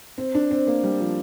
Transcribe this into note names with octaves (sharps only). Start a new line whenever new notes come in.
C4
D4
C4
A#3
G3
F3